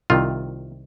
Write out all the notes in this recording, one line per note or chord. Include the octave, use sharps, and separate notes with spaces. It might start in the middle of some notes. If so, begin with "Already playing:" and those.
C2 C3 D#3 F4